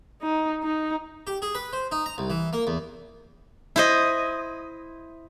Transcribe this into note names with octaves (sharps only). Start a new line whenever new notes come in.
D#4
D#4
G4
G#4
B4
C5
D#4
A#5
C2
E3
A#3
E2
E4 C5 D#5